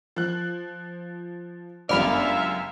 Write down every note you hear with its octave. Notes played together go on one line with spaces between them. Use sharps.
F3 F#6
G1 C#2 F#2 D5 E5 F5 B5 F6